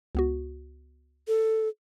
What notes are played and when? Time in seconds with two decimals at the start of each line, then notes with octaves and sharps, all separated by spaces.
0.15 C#2 B3 F#4
1.28 A4